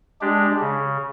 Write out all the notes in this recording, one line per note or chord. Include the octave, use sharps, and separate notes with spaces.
G#3 D4 G4
C#3